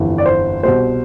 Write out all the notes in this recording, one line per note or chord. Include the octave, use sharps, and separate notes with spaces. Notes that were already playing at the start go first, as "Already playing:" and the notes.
Already playing: G1 F2 E3
D5
C5
C2 B2 C5